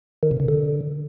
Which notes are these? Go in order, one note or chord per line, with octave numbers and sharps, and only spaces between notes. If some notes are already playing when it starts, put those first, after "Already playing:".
D#3
C3
C#3
D3